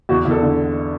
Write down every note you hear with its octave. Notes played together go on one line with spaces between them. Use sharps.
E2 F#4
E2
A4
D3